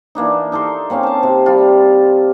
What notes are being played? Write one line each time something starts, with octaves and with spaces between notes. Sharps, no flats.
E3 A#3 D4 D#4
D#4 A4 A#4 C6
A#3 C4 C#4 F5
C5 A5
C3
G3 F4